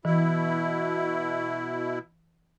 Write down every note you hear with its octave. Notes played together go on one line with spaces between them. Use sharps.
B2 E3 E4